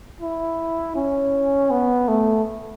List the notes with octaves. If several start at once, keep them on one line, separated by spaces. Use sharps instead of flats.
E4
C#4
B3
A3